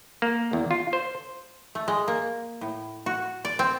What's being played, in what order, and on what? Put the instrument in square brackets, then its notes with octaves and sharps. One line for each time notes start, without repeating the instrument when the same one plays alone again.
[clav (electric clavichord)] A#3
E2
F4
C5
[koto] A3
G#3
A#3
A2
F#4
D5
C4